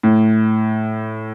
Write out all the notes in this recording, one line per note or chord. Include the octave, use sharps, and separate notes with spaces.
A2